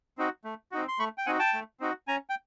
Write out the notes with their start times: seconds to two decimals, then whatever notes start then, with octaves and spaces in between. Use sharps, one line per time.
0.18 C4 D#4 F#4
0.44 A3
0.72 C4 D#4 F#4
0.88 C6
0.99 A3 B5 C#6
1.18 G5
1.26 C4 D#4 F#4 F#5 G#5
1.39 G5 A5
1.53 A3
1.80 C4 D#4 F#4
2.07 C#4 G#5 A#5
2.30 G5